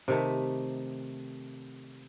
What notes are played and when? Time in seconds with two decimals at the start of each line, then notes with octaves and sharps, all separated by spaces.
0.08 C3 D#3 A3